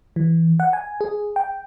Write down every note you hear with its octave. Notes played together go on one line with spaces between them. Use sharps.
E3
F#5
G#5
G#4
G5